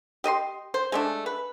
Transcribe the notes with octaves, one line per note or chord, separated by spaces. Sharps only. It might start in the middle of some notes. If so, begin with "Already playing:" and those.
G4 D#5 A#5 C6
C5
G#3 A3 D4
B4